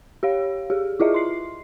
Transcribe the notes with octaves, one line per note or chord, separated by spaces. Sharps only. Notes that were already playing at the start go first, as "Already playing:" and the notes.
G4 C#5 F5
G4 G#4
E4 F4 G#4 D#5 E5
C6 C7